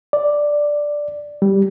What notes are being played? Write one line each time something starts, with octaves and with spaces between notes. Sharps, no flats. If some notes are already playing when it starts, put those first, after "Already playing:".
D5
G3